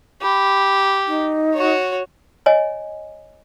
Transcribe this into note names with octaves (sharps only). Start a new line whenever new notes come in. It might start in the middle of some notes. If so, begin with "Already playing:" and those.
G4 B5
D#4
F#4 C#5
C#5 D#5 G#5